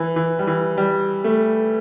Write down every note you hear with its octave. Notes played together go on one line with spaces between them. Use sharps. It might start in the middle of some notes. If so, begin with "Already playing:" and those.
Already playing: E3
E3
G3
E3
G3
A3